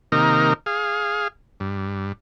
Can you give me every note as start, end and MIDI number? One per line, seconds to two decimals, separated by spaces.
0.12 0.53 48
0.12 0.53 51
0.12 0.53 58
0.12 0.53 63
0.12 0.53 70
0.66 1.28 68
0.66 1.28 77
1.60 2.13 43